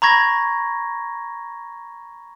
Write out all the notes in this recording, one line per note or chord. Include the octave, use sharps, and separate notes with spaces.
A#5 B5 C#6 G#6 A#6